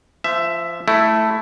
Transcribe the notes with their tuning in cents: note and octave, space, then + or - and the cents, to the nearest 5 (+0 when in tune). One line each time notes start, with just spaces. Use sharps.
F3 -20 E5 +10
A3 +0 E4 +0